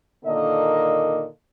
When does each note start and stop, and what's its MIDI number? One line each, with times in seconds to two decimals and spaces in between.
0.25 1.25 46
0.25 1.25 50
0.25 1.25 51
0.25 1.25 58
0.25 1.25 69
0.25 1.25 75